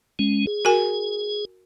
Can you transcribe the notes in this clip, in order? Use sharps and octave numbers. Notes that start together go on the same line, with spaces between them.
G#3 C#4
G#4
F#4 A#4 G#5